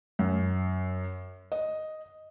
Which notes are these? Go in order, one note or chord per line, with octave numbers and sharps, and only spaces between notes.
F#2
D#5